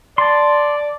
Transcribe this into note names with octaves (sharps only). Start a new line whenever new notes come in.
D5 A5 C6